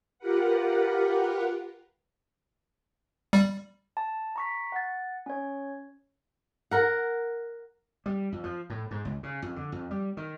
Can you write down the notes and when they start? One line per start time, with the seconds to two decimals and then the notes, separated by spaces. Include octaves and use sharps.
0.19 F4 G4 A#4 B4 F#5
3.33 G3
3.97 A5
4.36 A#5 C#6 B6
4.72 F#5 A6
5.26 C#4 C#5
6.71 A#4 F#5
8.06 G3
8.32 F2
8.44 F3
8.70 A2
8.91 G#2
9.05 C#2
9.23 C#3
9.42 F2
9.56 D3
9.72 F2
9.91 G3
10.17 D#3